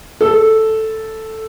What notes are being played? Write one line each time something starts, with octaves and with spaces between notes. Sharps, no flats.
A4